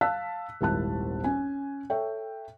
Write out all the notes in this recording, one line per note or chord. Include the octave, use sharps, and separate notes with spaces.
F5 A5 E6 F#6 B6
D#1 G#1 E4 A5 F#6
C#4 G#5
A4 C#5 E5 G5